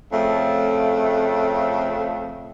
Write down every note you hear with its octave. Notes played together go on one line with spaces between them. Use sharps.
F2 C#3 A3